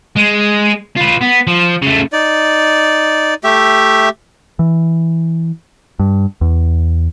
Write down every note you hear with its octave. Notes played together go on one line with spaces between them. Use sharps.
G#3
F4 B4
B3
F3
C#3 A3
D#4 D5
A3 G4 E5
E3
G2
E2